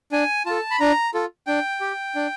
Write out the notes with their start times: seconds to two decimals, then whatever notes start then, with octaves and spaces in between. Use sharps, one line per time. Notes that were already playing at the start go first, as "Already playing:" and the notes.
0.12 D4 G#5
0.46 F4 A4 A5
0.71 B5
0.80 D4 A#5
1.14 F4 A4
1.47 D4 G5
1.81 G4
2.15 D4